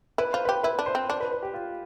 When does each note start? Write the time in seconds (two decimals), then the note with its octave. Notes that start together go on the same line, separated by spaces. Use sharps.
0.18 E4 B4
0.33 F4 C5
0.45 G4 B4
0.63 E4 B4
0.79 D4
0.86 C5
0.95 C4
1.09 D4 C5
1.20 B4
1.32 B4
1.43 G4
1.54 F4